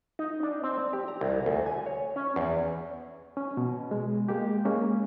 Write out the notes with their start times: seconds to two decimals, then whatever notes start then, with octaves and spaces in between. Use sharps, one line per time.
0.19 D#4
0.43 D4
0.64 C4
0.79 D5
0.93 G4
1.08 A#5
1.21 C2
1.46 D2
1.66 G#5
1.86 C#5
2.16 C#4
2.36 E2
3.37 C#4
3.57 B2
3.91 G#3
4.29 G#3 A#3 G4
4.65 G#3 A#3 C#4